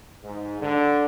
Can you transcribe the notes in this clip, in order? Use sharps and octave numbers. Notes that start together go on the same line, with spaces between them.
G#2
D3